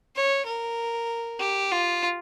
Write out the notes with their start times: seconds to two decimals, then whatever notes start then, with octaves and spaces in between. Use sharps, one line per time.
0.15 C#5
0.46 A#4
1.39 G4
1.71 F4